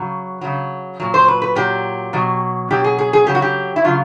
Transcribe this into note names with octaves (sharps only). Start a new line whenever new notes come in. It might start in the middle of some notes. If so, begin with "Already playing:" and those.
Already playing: C#3 F#3
C#3 F#3
A#2 F#3
C5
B4
B4
A#2 F#3 G4
B2 F#3
B2 F#3 G4
G#4
G#4
G#4
C#3 F#3 G4
F#4
G4
E4
C#3 F#3 F4